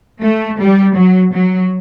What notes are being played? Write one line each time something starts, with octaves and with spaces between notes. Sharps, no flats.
A3
G3
F#3
F#3